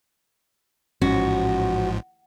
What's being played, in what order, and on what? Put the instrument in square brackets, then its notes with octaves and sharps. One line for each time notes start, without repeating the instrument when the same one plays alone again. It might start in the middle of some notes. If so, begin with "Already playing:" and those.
[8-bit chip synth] A1 G#2 F3 [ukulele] C#4 [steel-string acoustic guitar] F#4